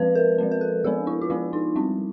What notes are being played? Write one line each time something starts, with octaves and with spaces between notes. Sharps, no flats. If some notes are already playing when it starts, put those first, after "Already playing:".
Already playing: F3 G#3 C4 B4
A#4
F3 G#3 C4
A#4
A4
F3 G#3 B3 D4 G4
E4
F4
F3 G#3 B3 D4 E4
D#4
G3 C4 E4